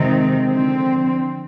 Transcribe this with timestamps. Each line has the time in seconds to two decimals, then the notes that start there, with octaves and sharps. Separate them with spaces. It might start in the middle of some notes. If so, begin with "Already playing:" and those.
Already playing: C3 D#3 G#3 C4 D#4
0.43 D3 F3 C4